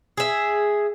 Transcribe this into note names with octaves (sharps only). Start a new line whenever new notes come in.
G#4 E5